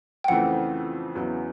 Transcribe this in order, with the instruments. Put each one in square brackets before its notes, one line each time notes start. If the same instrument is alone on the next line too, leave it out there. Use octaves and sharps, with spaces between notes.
[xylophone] G5
[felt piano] F2 C#3 E3 A3 C4 [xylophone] F#5
[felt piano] E2 C#3 F#3 B3 E4